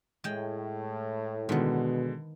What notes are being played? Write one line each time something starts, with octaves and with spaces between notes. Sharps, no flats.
A2 G#3 G5
B2 D3 D#3 G#3 B3